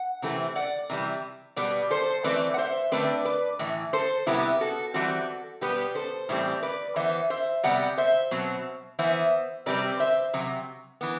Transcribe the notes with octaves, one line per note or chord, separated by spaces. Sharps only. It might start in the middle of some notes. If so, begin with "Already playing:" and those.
Already playing: F#5
C3 E3 A3 C4
D5 F#5
C3 E3 G3
B2 G3 B3 B4 D5
A4 C5
E3 A3 C4 B4 D5
F#5
C5 E5
D3 A3 C4 B4 D5
B4 D5
A2 E3
A4 C5
C3 G3 B3 E4 G4
F#4 A4
E3 G3 C4 F#4 A4
B2 G3 B3 G4 B4
A4 C5
A2 E3 G3 C4
B4 D5
E3 B3 C5 E5
C5 E5
C3 G3 B3 D5 F#5
C5 E5
B2 F#3 C4
E3 B3 C5 E5
C3 G3 C4 B4 D5
C5 E5
C3 F#3
E3 B3